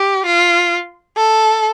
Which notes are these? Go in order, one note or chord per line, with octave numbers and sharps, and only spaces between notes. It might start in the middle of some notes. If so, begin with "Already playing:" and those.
Already playing: G4
F4
A4